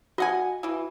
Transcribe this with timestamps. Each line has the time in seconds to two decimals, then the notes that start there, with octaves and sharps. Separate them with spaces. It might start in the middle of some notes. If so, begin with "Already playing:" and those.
0.18 F#4 D#5 F#5 G#5
0.63 E3 E4